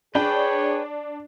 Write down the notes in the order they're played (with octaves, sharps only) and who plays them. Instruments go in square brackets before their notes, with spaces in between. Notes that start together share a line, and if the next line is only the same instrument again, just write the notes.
[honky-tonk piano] D4 [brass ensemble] G#4 C#5 [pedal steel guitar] B4 G5